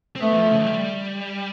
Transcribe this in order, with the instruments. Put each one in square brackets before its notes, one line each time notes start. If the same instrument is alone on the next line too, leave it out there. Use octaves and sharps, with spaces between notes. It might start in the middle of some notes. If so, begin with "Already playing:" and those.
[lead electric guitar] C4
[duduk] A3 [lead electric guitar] B3
[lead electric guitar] E3
F3
C#3
G3